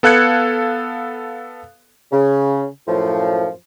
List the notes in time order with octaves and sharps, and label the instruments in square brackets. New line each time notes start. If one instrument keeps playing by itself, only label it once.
[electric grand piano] B3 A4 F5 F#6 G#6 C#7
[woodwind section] C#3
F#2 A2 F3